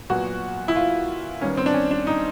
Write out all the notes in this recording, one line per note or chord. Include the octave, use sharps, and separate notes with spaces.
A#2 F#3 B3 F#4
E4
F4
D#3 G3 B3 C#4
C4
D4
C#4
D4
D#4